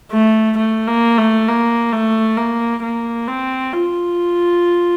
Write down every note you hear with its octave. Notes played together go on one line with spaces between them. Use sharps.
A3
A3
A#3
A3
A#3
A3
A#3
A#3
C4
F4